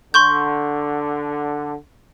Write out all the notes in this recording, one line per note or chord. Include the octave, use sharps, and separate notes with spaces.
D3 C6 C#6 G6